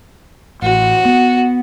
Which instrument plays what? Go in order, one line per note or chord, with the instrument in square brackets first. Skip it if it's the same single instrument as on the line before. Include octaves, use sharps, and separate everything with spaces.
[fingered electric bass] A1 [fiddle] F#4
[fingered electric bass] B3